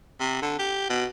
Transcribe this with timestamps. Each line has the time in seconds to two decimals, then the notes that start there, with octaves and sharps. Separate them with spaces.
0.20 C3
0.42 D3
0.59 G4
0.90 B2